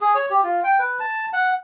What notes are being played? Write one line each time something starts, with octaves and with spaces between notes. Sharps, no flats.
G#4
C#5
G4
F4
G5
B4
A5
F#5